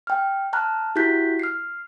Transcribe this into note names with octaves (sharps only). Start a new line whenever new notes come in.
G5 F6
A5 A#5 F6 F#6
E4 F#4 G4 F#6 G6 B6
F6 C7